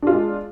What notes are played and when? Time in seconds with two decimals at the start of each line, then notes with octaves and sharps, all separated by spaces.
0.02 D4
0.07 F4
0.11 G#3